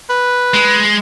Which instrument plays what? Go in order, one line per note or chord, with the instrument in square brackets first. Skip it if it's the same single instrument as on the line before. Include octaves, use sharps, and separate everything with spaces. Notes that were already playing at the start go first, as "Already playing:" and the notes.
[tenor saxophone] B4
[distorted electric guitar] G#3